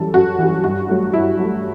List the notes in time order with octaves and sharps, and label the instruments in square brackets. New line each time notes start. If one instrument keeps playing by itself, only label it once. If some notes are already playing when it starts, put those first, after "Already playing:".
Already playing: [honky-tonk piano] F#2 E3 G3 A4
F#2 F#4
E3 G3
G2 F#4
F#3 A3
G2 E4
F#3 A3